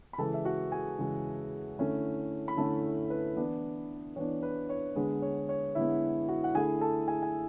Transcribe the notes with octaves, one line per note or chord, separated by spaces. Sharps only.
B5
C#3 E3 G#3 A4 A5
E5
F#4 F#5
G#4 G#5
C#3 E3 G#3
D3 A3 C#4 E4
B5
D3 A3 C#4 E4 A4 A5
B4
E3 B3 D4
E3 B3 D4 C#5
B4
C#5
D3 G#3 B3 B4
C#5
C#5
D3 G#3 B3 E4 E5
F#4 F#5
F#5
D3 A3 E4 G#4 G#5
A4 A5
G#4 G#5
G#5